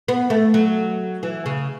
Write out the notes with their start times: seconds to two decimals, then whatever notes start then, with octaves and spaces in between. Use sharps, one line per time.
0.08 B3
0.30 A3
0.54 F#3
1.23 E3
1.46 C#3